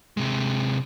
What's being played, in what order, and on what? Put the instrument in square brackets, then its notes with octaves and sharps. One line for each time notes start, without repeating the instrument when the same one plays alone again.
[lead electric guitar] C3 G#3